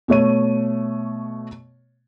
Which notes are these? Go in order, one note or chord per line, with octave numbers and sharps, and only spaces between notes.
B2 A3 C#5 D#7